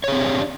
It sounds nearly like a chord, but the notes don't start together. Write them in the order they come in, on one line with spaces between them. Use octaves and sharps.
C#5 G#4 C4 G4 D4